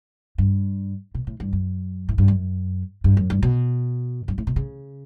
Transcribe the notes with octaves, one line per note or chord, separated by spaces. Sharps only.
G2
B2
A2
G2
F#2
A2
G2
F#2
G2
F#2
G2
B2
G2
A2
B2
C#3